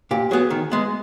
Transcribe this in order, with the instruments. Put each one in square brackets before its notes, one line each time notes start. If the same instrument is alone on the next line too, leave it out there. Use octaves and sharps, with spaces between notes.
[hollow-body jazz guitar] A#2 G4
F#3 B3 G#4
D#3
G#3 B3